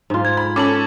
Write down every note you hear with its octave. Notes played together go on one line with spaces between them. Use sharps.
G#2 F4
G#6
B5 G#6
C#4 A4 D6 F#7